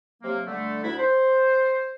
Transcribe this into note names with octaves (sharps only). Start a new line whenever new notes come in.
C3 F#3 A#3
D3 G3 A3
D2 D4 E4 B5
C5